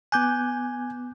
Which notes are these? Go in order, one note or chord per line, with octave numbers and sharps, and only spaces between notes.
B3 G#5 D6 F#6 G6